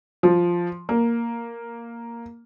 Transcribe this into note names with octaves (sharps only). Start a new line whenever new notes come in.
F3
A#3